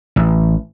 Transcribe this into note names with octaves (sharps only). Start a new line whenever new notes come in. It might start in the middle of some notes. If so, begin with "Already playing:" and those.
A1